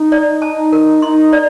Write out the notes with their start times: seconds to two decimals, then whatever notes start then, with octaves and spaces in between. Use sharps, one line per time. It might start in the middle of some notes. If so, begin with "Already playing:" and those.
Already playing: D#4
0.12 D5
0.42 A5
0.73 A#4
1.02 D#4 C6
1.33 D5